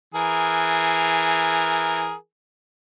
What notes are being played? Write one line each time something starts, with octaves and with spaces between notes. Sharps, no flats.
E3 G#4 A#4